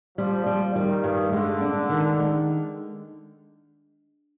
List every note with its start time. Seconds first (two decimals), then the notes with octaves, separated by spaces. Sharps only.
0.18 F3 G3
0.46 G3
0.75 D#3 G3
1.04 G2
1.32 D3 G#3
1.61 D4
1.89 D#3
2.19 G#3